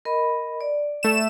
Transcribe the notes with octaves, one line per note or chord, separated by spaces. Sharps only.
A#4 D#5 B5
D5
A3 E7